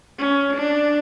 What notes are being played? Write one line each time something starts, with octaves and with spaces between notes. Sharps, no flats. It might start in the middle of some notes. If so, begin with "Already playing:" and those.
C#4
D4